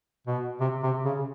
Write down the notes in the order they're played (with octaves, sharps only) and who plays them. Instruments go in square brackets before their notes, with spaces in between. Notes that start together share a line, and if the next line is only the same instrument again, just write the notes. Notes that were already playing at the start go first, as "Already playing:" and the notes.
[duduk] B2
C3
C3
C#3